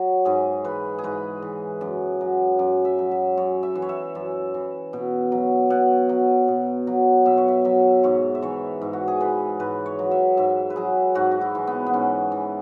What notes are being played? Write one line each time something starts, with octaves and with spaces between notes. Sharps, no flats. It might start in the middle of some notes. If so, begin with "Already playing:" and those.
Already playing: F#3 C#5
G#2 G#4
E3 B4
G#4
G#2 B4
E3
F#2
F#3
F#2
E5
F#3
E5
F#2 C#5
E5
E3
C#5
E5
F#2
E3
B2
F#3
B2 F#5
F#3
B2
F#3
B2 E5
C#5
E5
F#3 E5
G#2 C#5
E5
E3 C#5
G#2
F#4
G#4
E3 B4
G#2 B4
C#5
F#3
E5
G#2 E5
B4
F#3 G#4
G#2 F#4
F#4
E4
E3
B3
B3
G#2 C#4
E3